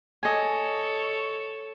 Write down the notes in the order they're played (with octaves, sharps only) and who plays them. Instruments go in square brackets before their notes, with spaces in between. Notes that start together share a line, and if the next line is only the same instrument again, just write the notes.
[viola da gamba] A4 C#5 [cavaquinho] D#5 G#5